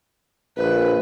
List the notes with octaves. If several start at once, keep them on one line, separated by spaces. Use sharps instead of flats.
A#1 B4